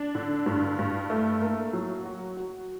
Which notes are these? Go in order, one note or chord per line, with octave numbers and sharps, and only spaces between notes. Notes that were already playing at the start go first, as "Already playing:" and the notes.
Already playing: D4
D3
G2
G2
A3
A#3
F#3
F#4
F#4